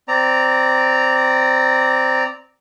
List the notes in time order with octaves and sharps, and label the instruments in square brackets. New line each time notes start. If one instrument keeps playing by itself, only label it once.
[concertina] C4 D5 A#5